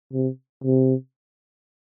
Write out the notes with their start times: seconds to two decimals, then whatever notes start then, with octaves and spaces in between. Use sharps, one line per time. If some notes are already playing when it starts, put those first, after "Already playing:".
0.13 C3
0.64 C3